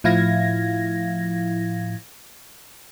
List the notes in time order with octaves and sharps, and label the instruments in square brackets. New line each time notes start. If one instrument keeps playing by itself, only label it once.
[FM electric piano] A2 F3 E4 F5 G#6 A#6